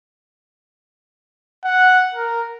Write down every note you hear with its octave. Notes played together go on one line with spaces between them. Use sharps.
F#5
A#4